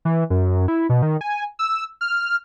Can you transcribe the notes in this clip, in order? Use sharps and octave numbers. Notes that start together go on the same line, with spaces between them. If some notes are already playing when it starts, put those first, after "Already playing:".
E3
F#2
E4
B2
D#3
G#5
E6
F6